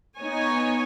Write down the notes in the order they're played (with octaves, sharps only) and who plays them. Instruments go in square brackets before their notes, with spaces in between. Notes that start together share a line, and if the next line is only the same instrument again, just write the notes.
[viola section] B3 D#4 C#5 G#5